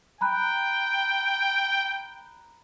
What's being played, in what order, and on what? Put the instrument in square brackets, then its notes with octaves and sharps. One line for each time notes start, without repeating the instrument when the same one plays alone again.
[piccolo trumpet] G5 [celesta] A#5 B5 F#6